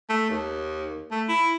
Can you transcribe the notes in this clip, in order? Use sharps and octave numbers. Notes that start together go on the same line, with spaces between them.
A3
D#2
A3
E4